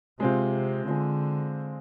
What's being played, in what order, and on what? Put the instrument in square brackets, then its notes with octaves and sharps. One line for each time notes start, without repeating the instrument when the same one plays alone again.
[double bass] C3 [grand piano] G#3 C4 F4
[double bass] D3 [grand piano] G#3 C4 F4